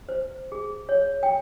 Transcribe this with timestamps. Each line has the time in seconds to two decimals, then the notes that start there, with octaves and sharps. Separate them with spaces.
0.09 C5
0.52 G#4
0.89 C#5
1.23 G5